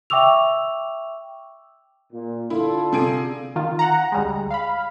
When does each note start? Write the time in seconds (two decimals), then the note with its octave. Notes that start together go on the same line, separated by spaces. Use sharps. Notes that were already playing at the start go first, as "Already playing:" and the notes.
0.10 E5 G5 C#6 D6 E6 F7
2.12 A#2
2.50 D3 E4 F4 A4
2.93 C3 G#4 D7
3.56 D#3 F4
3.79 F#5 A#5
4.12 D2 G3 G#3
4.51 F5 B5